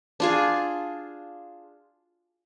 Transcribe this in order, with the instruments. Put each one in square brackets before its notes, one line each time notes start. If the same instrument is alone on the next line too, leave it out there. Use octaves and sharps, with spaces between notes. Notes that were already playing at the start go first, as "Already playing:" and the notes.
[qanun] D4 F4 G#4